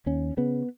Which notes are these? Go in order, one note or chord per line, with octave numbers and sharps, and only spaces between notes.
D#2 C#4
C#3 B3